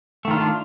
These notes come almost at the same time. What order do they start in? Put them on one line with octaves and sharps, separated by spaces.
A3 D#3 F4 D4